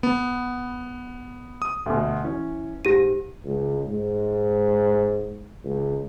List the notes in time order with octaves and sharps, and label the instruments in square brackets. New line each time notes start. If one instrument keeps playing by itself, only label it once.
[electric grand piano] B3
D#6
[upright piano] D2 B2
E3 C#4
[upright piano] G#2 A#6 [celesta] G4 D#7
[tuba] C#2
G#2
C#2